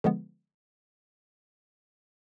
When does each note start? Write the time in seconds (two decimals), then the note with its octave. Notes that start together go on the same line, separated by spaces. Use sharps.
0.04 D3 F3 G#3 B3